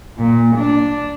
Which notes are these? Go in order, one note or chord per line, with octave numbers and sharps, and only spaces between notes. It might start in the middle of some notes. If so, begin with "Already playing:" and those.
A#2
D4